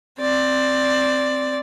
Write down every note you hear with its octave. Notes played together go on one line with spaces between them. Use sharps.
C4 D5